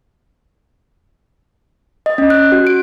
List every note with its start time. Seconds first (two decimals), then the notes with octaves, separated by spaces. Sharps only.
2.06 D#5
2.18 C#4
2.30 F#6
2.52 F#4
2.67 D7